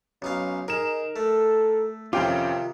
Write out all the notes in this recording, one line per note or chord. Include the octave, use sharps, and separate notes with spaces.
B1 C#4 D#4 F5
D#4 G#4 A#4 E7
A3 A4
F2 C3 D#3 C#4 F4 G5 D6